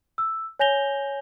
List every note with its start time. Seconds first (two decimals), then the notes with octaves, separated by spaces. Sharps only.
0.18 E6
0.59 C#5 G#5 G6 A#6 F7 G7